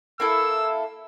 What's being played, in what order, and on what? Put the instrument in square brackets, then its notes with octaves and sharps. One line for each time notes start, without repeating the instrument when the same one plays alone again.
[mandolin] A#3 E4 A4 [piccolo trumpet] E6